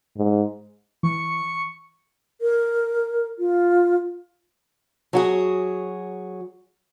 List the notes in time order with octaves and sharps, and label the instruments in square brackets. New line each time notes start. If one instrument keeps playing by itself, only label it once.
[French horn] G#2
[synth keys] E3 [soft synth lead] C#6
[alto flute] A#4
F4
[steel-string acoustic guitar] F#3 F#4 G#4